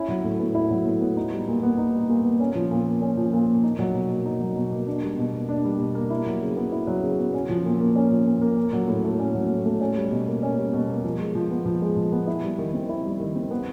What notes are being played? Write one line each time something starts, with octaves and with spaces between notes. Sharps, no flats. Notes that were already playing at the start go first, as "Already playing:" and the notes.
Already playing: C#4 E4
F#3
A2
B3
E4
F#3
A2
B3
D#4
G3
A#2
B3
D#4
G3
A#2
B3
C#4
F3
A#2
A#3
C#4
F3
A#2
A#3
D#4
F#3
B2
A#3
D#4
F#3
B2
A#3
D4
G3
B2
A#3
D4
G3
B2
A#3
E4
F#3
C#3
B3
E4
F#3
C#3
B3
C#4
F3
A#2
A#3
C#4
F3
A#2
A#3
C#4
F#3
A2
A3
C#4
F#3
A2
A3
C#4
G3
B2
A#3
C#4
G3
B2
A#3
F3
G#3
F3
B3
F3
G#3
F3
B3
E4
G3
D#3
C4
E4
G3
D#3
C4
B3